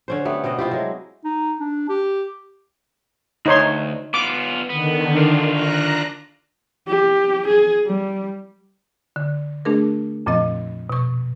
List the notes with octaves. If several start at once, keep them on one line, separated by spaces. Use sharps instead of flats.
D3 C#4 C5
A3 B3 G4
B2 B3 C4 D#5
C3 E4 F4 G4
F#3 G#3
D#4
D4
G4
D2 D#4 C#5 C6
B3 F4 D6
D3 D#3 B3
D4 F4
A#5 F#6 A#6
G4
G#4
G3
D3
A3 D4 G#4 A#4
F2 A#2 F3 C4 D#5
B2 C#6